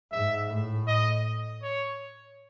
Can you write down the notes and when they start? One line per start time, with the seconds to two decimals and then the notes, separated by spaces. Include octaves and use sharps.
0.12 G#2 E5
0.50 A2
0.87 D#5
1.63 C#5